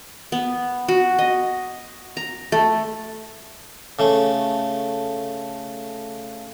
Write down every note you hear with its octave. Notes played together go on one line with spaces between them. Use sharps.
B3
F#4
D#5
A#5
A3
C#3 A3